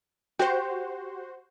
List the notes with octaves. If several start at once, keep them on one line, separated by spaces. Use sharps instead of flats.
F#4 G4 C5